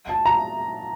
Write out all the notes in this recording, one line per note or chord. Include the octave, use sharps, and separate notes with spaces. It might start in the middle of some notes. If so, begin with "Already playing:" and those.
A5
A#5